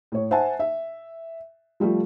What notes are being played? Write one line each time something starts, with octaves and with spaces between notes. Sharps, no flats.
A2 C#5
C5 E5 F#5 G#5 A5
E5
F3 G3 A3 F4